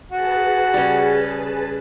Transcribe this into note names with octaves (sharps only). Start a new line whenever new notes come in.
F#4 G#4 B4 A5
C#3 G3